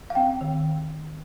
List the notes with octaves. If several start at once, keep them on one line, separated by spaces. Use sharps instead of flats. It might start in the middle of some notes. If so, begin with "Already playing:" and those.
F5
C4 G5
D#3